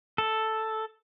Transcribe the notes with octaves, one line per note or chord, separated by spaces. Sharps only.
A4